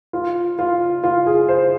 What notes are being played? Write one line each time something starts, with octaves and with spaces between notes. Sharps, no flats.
F4
F4
F4
G#4
C5